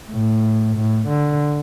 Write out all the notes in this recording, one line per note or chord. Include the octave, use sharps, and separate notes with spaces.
A2
A2
D3